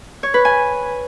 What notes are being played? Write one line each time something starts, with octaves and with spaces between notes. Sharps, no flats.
C#5
B4
G#5